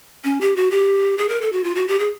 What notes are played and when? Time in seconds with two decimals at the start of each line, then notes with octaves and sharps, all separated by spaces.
0.24 C#4
0.41 G4
0.56 F#4
0.71 G4
1.18 G#4
1.29 A#4
1.41 A4
1.52 F#4
1.64 F4
1.75 F#4
1.88 G4
1.99 G#4